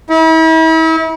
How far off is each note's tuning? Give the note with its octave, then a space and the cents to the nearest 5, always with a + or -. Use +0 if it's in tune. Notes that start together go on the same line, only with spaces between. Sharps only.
E4 -40